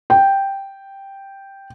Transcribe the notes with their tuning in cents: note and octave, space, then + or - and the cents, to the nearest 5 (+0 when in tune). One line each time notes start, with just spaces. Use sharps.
G5 +0